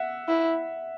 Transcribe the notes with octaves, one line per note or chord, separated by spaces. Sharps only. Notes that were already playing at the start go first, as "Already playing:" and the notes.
Already playing: E5 F#5
E4